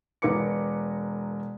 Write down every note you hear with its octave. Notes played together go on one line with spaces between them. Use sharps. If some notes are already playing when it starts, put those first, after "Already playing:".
E1 A#4 B4 D6 C#7